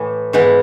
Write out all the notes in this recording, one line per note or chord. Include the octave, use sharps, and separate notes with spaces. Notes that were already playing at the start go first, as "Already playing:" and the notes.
Already playing: A2 E3 A3
G#2 E3 B3